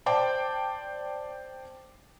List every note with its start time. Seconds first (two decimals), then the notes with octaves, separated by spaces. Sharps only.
0.06 C5 D5 G5 A5 D6